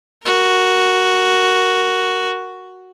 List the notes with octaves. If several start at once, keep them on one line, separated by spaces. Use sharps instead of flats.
F#4 A#4